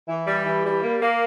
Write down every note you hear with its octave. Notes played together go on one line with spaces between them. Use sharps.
E3
G3
E3
G3
A#3
A#3